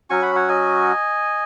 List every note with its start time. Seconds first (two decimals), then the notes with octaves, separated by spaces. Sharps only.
0.10 F#3 C#4 F#4 G#5 C#6
0.22 F#5 B5
0.35 C#5 F#5
0.49 D#5 G#5